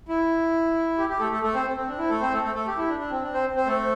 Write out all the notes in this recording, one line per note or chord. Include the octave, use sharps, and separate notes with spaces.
E4
G4
G4
A3 A4
A3 A4
A3 A4
C4 C5
C4
C4
D4
E4
A3 A4
C4 C5
A3 A4
A3 A4
A3 A4
G4
E4
D4
D4
C4
D4
C4 C5
C4 C5
A3 A4